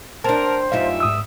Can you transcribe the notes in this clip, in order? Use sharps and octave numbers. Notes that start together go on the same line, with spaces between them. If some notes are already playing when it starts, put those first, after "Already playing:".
C4 D4 A#4 C5 A5
F#2 B2 G3 D#4 F4 E5 F5
G#2 D#6 E6